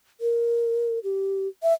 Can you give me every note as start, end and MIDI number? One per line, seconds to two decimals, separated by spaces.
0.21 0.99 70
1.04 1.48 67
1.63 1.73 76